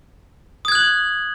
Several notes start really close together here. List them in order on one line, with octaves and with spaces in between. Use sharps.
D#6 G#6 F#6 F#7